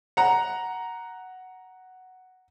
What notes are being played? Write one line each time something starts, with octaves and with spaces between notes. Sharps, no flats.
F#5 A#5